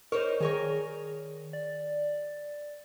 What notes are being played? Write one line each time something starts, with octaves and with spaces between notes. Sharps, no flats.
D#4 A#4 C5 C#5
D#3 G#4 A#4 C#5
D5